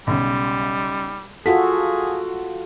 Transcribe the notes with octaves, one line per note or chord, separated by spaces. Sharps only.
B1 C#3 G3
F4 F#4 G#4 A4 B6